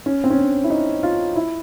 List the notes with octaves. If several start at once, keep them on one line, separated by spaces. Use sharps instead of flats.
C#4
C4
C#4
D4
E4
D#4
F4
E4